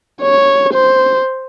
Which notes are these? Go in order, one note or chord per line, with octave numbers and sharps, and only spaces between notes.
C#5
C5